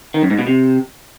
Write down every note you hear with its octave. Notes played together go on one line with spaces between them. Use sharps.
D#3
F#2
G#2
B2
C3